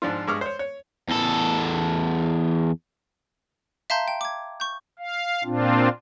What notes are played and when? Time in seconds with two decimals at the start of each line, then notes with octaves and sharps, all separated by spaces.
0.02 G#2 F3 D4 F4
0.27 G2 G#3 C#6 D6 F6
0.41 C5 C#5
0.59 C#5
1.08 E2 A4
3.90 E5 F5 A5 A#5 C6 G6
4.08 G5
4.21 D6 G#6
4.60 C#6 G6
4.99 F5
5.44 A#2 C4 D4 F4